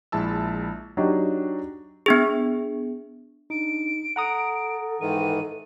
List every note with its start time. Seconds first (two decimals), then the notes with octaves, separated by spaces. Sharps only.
0.12 A#1 G#3 E4 A5 E6
0.97 F#3 D4 D#4 F#4 G4
2.06 B3 D4 G#4
3.50 D4 D#4 D7
4.16 A4 F#5 A#5 D#6
5.01 G#2 D#3 E3 D#7